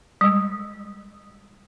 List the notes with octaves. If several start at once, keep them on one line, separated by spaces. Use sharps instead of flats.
G3 G#3